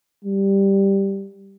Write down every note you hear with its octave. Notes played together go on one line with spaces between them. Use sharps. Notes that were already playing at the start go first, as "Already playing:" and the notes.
G3